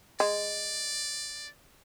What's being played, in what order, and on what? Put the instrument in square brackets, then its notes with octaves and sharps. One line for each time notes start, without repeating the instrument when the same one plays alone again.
[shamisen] G#3 [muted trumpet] D5